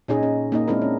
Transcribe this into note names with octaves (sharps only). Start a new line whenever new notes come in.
A#2 C#4 D#4 G#4 D#5
C#4
A#3 D#4 D#5
G#3 C4 D4 E4 A#4
C#4